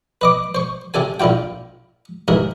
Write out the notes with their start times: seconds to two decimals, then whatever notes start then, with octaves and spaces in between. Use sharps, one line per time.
0.21 B4 D#5 D6
0.55 C5 C#6
0.94 C3 C4 A4 G#5
1.20 A#1 A#2 E4 F4 G5
2.28 D#2 G#2 E3 A#4